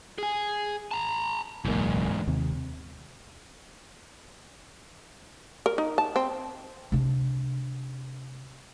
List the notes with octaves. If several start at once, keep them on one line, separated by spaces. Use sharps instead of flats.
G#4 G#5
A5 A#5
D1 B1 E2 G#2 A#3
D#2 C3
A#4
D#4
A5
C4
C3 D4